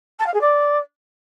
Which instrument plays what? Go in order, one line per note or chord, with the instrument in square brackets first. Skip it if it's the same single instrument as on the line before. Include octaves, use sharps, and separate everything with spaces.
[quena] A5
F5
G#4
D5